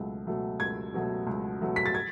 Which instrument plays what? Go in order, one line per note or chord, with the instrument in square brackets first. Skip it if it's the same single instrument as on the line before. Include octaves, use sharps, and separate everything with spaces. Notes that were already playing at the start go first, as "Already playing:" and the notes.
Already playing: [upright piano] C#2 B2 F#3 A3
B2 F#3 A3
C#2 G#6
B2 F#3 A3
C#2
B2 F#3 A3
B6
A6
G#6